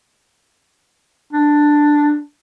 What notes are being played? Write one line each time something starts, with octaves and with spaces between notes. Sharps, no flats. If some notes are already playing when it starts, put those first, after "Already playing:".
D4